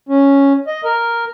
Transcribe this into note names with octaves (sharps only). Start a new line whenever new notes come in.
C#4
D#5
A#4